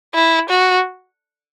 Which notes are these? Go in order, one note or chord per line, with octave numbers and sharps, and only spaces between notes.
E4
F#4